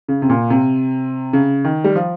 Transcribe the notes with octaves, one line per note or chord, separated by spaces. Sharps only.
C#3
C3
A#2
C3
C#3
D#3
G3
F3